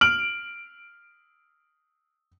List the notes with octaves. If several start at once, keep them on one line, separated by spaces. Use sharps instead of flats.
F6 D7 F#7